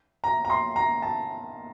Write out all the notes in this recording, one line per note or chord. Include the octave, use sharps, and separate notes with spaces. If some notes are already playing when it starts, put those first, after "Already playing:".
A#5
A#5
C6
A#5
A5